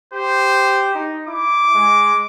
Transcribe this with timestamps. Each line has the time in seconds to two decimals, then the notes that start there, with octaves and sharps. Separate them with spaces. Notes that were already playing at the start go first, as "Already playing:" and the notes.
0.13 G4 C5
0.95 D#4
1.27 E4 D6
1.74 G#3